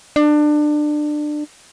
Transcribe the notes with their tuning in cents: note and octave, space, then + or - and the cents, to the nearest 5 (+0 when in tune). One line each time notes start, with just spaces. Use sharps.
D4 +25